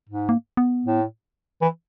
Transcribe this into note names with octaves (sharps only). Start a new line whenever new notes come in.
G#2
A#3
B3
A2
E3